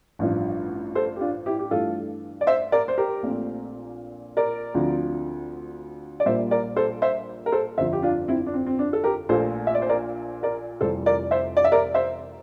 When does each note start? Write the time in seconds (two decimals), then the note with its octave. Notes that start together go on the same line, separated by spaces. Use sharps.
0.19 A1 G2 F3
0.95 A4 C5
1.16 G4
1.21 D4 F4
1.46 E4 G4
1.59 G4
1.71 G2 E3 A3 F4 A4
2.41 D5
2.47 C5 E5
2.72 A#4 D5
2.88 C5
2.98 G4 A#4
3.23 A#1 A#2 A3 C4
4.37 A#4 D5
4.74 D2 D3 F3 C4
6.20 D5
6.26 A#1 A#2 G3 A#3 C5 E5
6.51 A#4 D5
6.76 A4 C5
7.02 C5 E5
7.46 A#4
7.52 A4 C5
7.77 G1 F2 D3 F3 C5 E5
7.93 G4
8.02 D4 F4
8.28 C4 E4
8.47 D4
8.54 C4
8.67 C4
8.79 D4
8.93 A4
9.04 G4 A#4
9.29 A#1 A#2 A3 A4 C5
9.67 E5
9.75 D5
9.82 C5
9.89 A#4 D5
10.43 A#4 D5
10.81 F1 F2 E3 G3 A4 C5
11.06 A#4 D5
11.31 C5 E5
11.57 D5
11.64 E5
11.72 A#4 D5
11.94 C5 E5